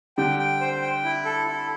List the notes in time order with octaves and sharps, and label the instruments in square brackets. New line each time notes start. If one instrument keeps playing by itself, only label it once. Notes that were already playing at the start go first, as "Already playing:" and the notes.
[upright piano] D3 G3 [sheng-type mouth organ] G5
[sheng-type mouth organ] G5
C5
G5
E4
A4
E4